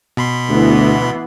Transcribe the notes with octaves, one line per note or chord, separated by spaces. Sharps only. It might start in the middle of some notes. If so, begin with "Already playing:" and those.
B2 B5 C6
D2 E3 B3 E4